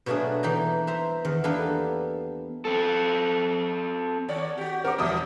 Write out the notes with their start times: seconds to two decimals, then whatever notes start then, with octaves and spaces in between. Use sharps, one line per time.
0.06 B2 F#3 A3 A#3 D4 G#4
0.43 E3 D#4 G5 A#5
0.87 C5 E5 A#5
1.25 E2 D#3
1.44 A#3 B3 D4 G4 A4 B4
2.65 C4 A4
4.29 D#2 C#5 D5
4.58 F#4 G4
4.84 C4 A#4 D6
4.98 E1 E3 E5 D#6